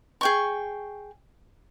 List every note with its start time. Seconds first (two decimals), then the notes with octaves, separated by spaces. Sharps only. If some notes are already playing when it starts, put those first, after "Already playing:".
0.21 G#4 G5 C#6